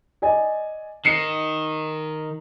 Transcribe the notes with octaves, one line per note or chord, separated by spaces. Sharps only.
D5 D#5 G#5
D#3 C7 C#7